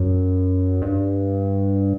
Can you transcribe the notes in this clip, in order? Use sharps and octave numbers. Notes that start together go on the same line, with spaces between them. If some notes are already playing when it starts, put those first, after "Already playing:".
Already playing: F#2
G2